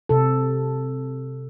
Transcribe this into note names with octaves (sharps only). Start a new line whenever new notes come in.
C3 A4